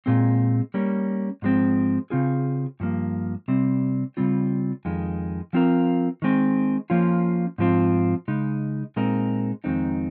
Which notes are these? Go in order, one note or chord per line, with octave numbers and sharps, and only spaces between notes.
A#2 G#3 C4
G3 A#3 C#4
G#2 F3 G#3 C4
C#3 F3 C4 F4 G#4
G2 F3 A#3
C3 G3 C4
C#3 G3 C4 F4
F2 D#3 G#3
F3 C4 F4 A#4
D#3 G#3 C4
F3 A#3 C#4 F4
G#2 F3 C4 F4
C#3 G#3 D#4
A#2 G#3 C4 D#4 A#4
F2 D#3 G#3 C4 D#4